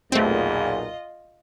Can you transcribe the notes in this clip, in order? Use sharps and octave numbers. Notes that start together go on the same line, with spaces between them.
B1 E2 A#2 A3 C4 F4 D#5